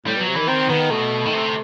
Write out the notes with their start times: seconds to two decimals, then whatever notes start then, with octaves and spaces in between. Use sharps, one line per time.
0.06 A2 G3
0.16 B2 F#3
0.27 C3
0.35 D#3 E3
0.48 D#3 C4
0.69 D#3 B3
0.90 B2 A3
1.25 D#3
1.33 C3